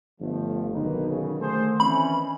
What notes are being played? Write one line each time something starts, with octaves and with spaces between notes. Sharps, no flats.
G1 F3 A3
B1 D3 D#3 A#3 D#4 B4
C#3
A3 G#4 A4 C5
E3 C4 C#4 B5